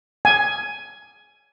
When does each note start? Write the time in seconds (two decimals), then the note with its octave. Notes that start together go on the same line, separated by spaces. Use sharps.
0.25 G#5